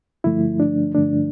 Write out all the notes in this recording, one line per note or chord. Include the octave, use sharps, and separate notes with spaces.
G2 D3 F3 A3 E4
D4
G2 D3 F3 A3 D4